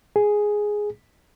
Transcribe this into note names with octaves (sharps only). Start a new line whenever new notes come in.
G#4